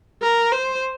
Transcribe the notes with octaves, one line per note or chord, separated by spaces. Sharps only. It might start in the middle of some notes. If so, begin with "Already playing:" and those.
A#4
C5